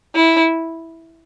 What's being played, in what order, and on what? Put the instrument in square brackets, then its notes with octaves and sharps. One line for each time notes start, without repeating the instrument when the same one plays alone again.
[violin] E4